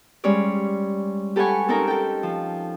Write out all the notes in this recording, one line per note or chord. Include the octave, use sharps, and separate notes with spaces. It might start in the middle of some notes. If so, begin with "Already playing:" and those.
G3 G#3 C#4 C#5 D5
G4 A4 B4 F#5 G#5 C#6
C4 C#4 D#4 A4 A#4 A#5
A4 G5
F3